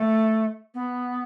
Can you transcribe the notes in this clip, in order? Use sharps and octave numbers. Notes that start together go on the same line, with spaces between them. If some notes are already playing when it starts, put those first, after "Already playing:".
Already playing: A3
B3